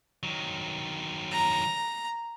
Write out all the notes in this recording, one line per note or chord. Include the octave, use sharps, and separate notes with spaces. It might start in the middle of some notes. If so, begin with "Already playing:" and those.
D#3 F#3
A#5